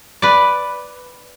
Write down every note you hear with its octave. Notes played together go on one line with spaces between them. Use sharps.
B4 D5